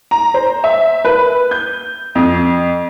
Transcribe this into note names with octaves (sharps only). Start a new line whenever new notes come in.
A#5
C5
E5
B4
G6
F2